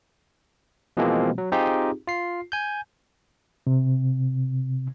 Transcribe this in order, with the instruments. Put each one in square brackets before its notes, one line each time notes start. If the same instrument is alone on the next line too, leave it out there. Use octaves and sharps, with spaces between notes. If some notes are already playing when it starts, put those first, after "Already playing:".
[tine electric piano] B2 E3 F3 G#3 A#3 C4
F#3
C4 D#4 F4 G4 G#4
F4 C7
G#5 G6
[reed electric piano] C3